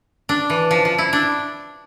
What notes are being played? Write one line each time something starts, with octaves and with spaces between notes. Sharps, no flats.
D4
E3
F3
F3
E4
D4